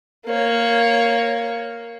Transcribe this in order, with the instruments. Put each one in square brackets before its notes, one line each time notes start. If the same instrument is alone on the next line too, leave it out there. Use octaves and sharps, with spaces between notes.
[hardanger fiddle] A#3 C#5